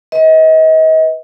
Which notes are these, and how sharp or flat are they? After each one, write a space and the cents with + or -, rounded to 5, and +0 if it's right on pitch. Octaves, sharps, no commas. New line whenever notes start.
B4 +0 D#5 +35